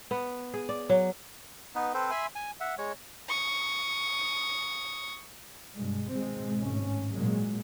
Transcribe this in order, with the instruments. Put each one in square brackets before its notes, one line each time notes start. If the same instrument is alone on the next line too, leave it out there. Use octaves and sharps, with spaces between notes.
[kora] B3
G#4
D5
F#3
[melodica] B3 D#4 B4
C4 A4 B4 C5
E5 G#5 B5 C6
G#5
E5 F#5
G#3 C#5
[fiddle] C#6 D#6
[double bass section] G2 B2 G#3
G#1 B2 G#3 C4
G#1 A2 C#4
A#2 F#3 G#3